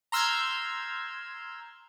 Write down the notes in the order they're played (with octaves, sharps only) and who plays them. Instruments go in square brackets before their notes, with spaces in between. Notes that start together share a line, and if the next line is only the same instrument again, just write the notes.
[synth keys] A#5 C6 E6 F6 G6 G#6